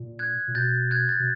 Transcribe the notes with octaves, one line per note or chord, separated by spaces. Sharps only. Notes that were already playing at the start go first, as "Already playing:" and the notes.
Already playing: A#2
F#6 G#6
A#2
B2 G6 A6
F#6 G#6
G6 A6
B2